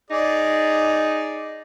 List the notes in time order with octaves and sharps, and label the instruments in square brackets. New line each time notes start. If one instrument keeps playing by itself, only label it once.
[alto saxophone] D#4 [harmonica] G#4 D5